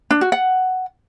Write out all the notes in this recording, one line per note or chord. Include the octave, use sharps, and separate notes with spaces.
D4
F#4
F#5